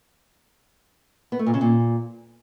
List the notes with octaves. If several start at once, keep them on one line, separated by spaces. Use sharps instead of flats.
B3
A3
A#2
C#3
A#2